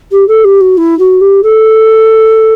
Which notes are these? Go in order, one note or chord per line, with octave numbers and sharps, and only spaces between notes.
G4
A4
G4
F#4
E4
F#4
G4
A4